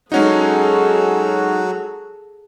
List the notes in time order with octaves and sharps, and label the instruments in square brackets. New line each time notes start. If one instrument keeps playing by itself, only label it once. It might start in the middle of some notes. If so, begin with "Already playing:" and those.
[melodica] F#3 F#4 [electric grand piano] G#3 C#4 D#4 [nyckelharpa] G#4 A4